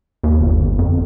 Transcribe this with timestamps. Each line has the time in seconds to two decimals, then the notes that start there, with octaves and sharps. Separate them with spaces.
0.24 D#2
0.41 G1
0.79 F2